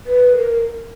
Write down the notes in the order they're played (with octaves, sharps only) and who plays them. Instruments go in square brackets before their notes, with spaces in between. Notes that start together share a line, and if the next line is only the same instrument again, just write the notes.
[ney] B4
A#4